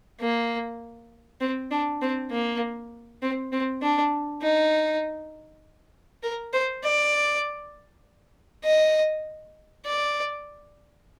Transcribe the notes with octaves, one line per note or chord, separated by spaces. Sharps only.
A#3
C4
D4
C4
A#3
C4
C4
D4
D#4
A#4
C5
D5
D#5
D5